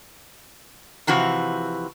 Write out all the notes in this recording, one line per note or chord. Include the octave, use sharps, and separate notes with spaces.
C3 E3 F3 F#4